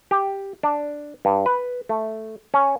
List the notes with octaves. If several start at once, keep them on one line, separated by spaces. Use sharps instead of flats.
G4
D4
G2
B4
A3
C#4